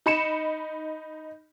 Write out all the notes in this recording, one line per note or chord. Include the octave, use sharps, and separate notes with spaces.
D#4 B5 C#7 E7